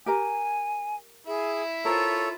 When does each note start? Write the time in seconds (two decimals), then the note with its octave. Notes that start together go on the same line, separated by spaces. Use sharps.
0.06 G4 A#4 G#5 A#5
1.27 E4 G#4 E5
1.85 F4 A4 A#4 C5 C#5